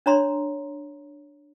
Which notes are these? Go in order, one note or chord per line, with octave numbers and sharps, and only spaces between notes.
D4 C#5 A#5 C6